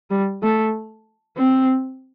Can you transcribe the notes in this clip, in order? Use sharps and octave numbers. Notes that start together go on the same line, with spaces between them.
G3
A3
C4